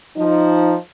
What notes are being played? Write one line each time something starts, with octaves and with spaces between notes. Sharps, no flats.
F3 D#4